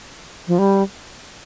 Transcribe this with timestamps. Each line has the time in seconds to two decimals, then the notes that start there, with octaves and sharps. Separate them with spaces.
0.48 F3
0.59 G3